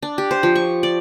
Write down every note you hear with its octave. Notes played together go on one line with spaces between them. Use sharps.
D4
G4
C5
F3
C#6
D5